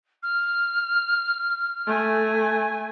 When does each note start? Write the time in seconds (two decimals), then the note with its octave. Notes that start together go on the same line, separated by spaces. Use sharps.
0.23 F6
1.87 A3 G#5